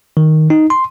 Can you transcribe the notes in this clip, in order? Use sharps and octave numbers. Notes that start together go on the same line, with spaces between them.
D#3
D#4
C6